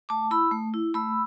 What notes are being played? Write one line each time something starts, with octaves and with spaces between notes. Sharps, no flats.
A3 A5 D6
E4 B5 E6
A3
E4
A3 B5 E6